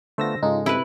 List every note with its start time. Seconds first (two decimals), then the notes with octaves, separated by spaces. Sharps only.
0.18 D3 A3 B3 F4 C5 E6 A#6
0.43 G#2 C#3 G#3 D#4 F4 A4
0.66 C3 E4 B4 F#6